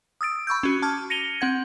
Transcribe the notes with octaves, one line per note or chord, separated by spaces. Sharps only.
D#6 E6 A6 D7
B5 C#6 E6 G6
C#4 F#4
A5 D6 F6 G#6
A#6 C#7 D#7 F7 G7
C4 F#5 G#6